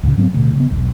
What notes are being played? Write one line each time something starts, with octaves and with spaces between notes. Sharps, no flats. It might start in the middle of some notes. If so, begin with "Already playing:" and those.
C#2 A2 C#3
G#2 F#3 B3 C4
D1 D2 B2
C#3 A3 B3
E1 B1